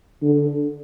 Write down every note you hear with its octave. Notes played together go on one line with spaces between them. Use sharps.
D3